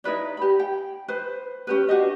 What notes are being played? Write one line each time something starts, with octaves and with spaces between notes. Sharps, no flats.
D#4 E4 B4 D5
G4 B5
G5
B4 C5
C#4 G4 B4
D4 F#4 G4 D#5